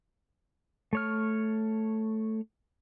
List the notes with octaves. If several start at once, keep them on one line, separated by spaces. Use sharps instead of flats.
A3 C#5 F6